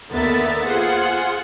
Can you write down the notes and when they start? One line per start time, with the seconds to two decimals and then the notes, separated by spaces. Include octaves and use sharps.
0.12 D#2 D3 B3 A#4 E5 A6
0.64 F4 G#4 C5 F#5